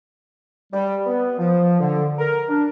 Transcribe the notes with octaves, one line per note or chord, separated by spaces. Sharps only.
G3
B3
F3
D3
A#4
D4